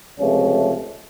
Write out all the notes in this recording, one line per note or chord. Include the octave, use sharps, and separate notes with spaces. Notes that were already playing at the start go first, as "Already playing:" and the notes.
C#2 C3 F3 A3 C#4